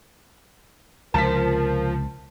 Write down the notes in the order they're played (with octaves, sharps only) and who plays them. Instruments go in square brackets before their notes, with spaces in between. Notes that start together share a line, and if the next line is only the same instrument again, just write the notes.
[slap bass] C#2 C3 [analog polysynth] F3 [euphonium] A#4 [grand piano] A5 B6